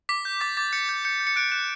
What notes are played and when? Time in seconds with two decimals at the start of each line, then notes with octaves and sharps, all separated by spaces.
0.09 D6 B6
0.25 G6
0.41 D6 A6
0.57 D6 A6
0.73 G6 C#7
0.89 G6
1.05 G6 C#7
1.20 G6
1.27 C#7
1.36 F#6 D7
1.52 F#6 E7